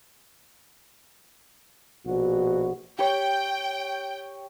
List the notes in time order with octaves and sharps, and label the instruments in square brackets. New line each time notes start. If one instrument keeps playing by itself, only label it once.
[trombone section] A#1 B2 F#4
[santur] G4 C#5 [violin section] G5